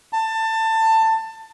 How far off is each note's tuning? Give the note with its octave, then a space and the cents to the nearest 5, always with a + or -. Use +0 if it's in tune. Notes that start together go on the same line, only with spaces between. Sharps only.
A5 +20